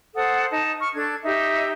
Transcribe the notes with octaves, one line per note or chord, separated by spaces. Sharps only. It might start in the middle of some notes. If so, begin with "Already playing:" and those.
A4 C5 F#5 D#6
D#4 A5
C#6 F6
D4 A4 G#6
D#4 G4 E5